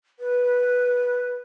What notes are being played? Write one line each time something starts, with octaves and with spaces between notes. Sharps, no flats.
B4